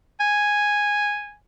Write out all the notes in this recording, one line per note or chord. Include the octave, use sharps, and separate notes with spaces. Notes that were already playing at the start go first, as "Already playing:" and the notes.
G#5